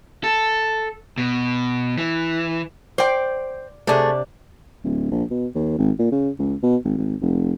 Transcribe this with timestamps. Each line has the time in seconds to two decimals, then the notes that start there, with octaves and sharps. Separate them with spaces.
0.24 A4
1.18 B2
1.98 E3
2.98 C5 D5 G5
3.87 C3 A3 D4 G#4
4.84 D1
5.11 A#1
5.30 B2
5.55 D#2
5.78 G#1
5.98 A#2
6.12 C#3
6.39 C#2
6.63 B2
6.85 G#1
6.98 G#1
7.21 F1